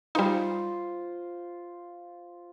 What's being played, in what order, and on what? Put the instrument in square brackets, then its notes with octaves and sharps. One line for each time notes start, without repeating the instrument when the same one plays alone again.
[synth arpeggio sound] G3 D#4 [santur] F4 C5